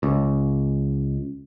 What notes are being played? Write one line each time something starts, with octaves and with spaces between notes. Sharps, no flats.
C#2